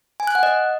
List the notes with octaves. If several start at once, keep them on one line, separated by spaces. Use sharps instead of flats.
G#5
F#6
F#5
D#5